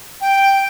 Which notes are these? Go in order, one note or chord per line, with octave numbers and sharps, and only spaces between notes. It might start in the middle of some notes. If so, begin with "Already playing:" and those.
G5